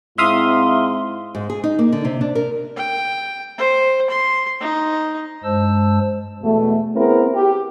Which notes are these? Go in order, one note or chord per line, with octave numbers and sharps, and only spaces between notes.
G#2 C4 E4 E5 F5 C6 D#6
G#2
G#4
D#4
A#3
D3
C3
D4
A#4
G5
C5
C6
D#4
G2 G#3 C5 A5 E6
E2 B2 A3
B3 C4 E4 G#4 A#4
G4